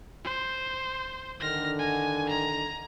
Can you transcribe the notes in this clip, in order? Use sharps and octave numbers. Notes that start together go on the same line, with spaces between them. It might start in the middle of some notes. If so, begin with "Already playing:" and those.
C5
D3 D#3 F6 A#6
G#5
A#5